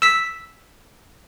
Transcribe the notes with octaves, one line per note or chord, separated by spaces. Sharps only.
E6 B6